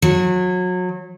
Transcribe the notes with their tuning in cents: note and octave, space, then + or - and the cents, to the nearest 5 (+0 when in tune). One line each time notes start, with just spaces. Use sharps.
F#3 -30